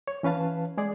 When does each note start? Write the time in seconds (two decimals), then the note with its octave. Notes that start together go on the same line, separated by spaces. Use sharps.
0.07 C#5
0.23 E3 C#4 B4 F5 A5
0.77 G#3 G#4 D5